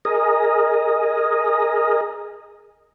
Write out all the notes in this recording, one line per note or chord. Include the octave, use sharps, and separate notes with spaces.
G#4 A#4 D#5